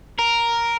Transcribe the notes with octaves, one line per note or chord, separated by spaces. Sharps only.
A#4